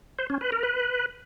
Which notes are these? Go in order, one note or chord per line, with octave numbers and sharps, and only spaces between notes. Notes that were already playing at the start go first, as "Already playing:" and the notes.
C5
C#4
B4
A#4
B4